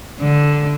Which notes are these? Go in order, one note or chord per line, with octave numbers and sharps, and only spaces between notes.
D3